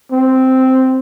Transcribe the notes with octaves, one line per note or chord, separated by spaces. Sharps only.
C4